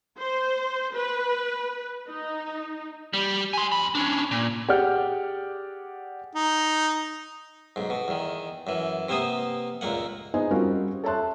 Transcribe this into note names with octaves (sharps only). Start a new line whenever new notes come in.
C5
B4
D#4
G3
G#5 C6
F2 B5
C#4 D4
A#2
G4 G#4 D5 F#5 F6 G6
D#4
B1 G#2
B2
E2 D#3
F#2 E3
C3 A#3 B3 C5 D#6
C#2 A#2 A#3 F#5
B3 D#4 G#4 C5 D#5 G#5
G3 C4 C#4 F4 F#4 A#4
A4 C#5 E5 A5 C6 F#6